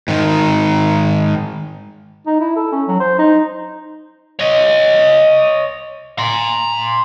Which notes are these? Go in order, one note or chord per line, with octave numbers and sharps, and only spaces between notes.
G#2 D#3
D#4
E4
A4
C#4
F#3
C5
D#4
C#5 D#5
A#5 C6